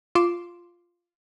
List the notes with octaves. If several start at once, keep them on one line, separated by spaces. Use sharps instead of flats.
F4 C6 D6 E7